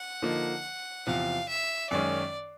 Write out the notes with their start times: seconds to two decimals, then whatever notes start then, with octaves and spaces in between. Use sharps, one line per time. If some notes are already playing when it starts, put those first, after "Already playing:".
Already playing: F#5
0.22 D3 F3 A#3 D#4
1.06 E2 C3 F3 F5
1.49 E5
1.90 F#2 D#3 G#3 C#4 D5